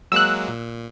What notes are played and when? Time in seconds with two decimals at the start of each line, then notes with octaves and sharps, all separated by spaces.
0.12 F#3 G#3 A#3 E6 F#6
0.48 A#2